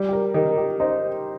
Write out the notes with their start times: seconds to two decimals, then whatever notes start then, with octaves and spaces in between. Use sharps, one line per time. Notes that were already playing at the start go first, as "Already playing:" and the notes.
Already playing: G3
0.09 G4
0.13 A#4
0.34 D#3 G4
0.57 G4
0.80 D#4 C5